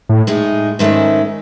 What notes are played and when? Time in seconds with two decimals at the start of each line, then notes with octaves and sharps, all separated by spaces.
0.09 A2
0.27 A2 G#3 D#4 G#4
0.79 G#2 D#3 A3 C#4 E4